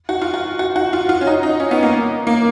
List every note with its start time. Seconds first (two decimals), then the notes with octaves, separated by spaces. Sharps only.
0.09 F#4
0.21 F4
0.34 F#4
0.59 F#4
0.76 F#4
0.93 F4
1.09 F4
1.21 C#4
1.27 D#4
1.43 D#4
1.60 C#4
1.71 B3
1.83 A#3
2.27 A#3